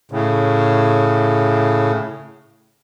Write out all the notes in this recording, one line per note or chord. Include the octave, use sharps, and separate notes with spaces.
A2 C#3